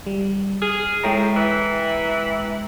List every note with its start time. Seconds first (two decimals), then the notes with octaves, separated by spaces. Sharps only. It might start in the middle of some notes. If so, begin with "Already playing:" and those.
0.07 G3
0.62 G#4 F6
1.04 A2 G#3 G5 A#5
1.36 E3